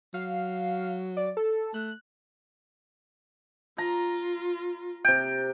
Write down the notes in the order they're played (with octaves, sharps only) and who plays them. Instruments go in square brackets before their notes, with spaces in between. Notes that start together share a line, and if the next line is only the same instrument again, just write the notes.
[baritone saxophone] F#3 [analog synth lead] F5
[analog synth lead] D5
A4
[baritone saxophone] A3 [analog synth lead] F#6
[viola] F4 [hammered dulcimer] A#5
[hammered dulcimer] C3 G5